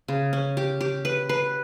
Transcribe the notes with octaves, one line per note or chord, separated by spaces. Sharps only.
C#3
C#4
G4
G4
B4
B4